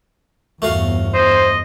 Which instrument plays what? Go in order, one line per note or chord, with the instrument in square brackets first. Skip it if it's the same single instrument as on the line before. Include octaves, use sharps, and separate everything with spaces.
[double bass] G1 E2 [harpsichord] A3 F#4 F5
[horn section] C5 [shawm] D#5